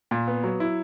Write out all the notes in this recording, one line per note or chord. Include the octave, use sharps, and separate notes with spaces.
A#2
B3
F#3
E4